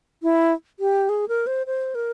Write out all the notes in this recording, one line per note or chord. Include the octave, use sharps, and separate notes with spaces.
E4
G4
G#4
A#4
C5
C5
A#4